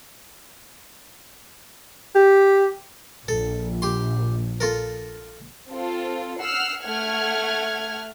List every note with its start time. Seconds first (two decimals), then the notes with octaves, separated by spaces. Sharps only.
2.16 G4
3.28 A#1 A4
3.82 G4 C6
4.60 F4 A4 A#4
5.69 C4 F4 A4
6.41 F#5 E6 F6 C7
6.85 A3 F#5 F6 G#6